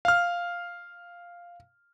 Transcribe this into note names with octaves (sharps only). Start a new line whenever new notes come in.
F5 F6